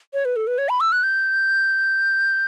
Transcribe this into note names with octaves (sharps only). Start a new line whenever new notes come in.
C#5
B4
A4
B4
C#5
B5
E6
F#6
G6